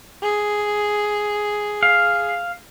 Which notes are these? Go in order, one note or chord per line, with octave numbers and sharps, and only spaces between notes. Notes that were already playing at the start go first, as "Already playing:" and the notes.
G#4
F5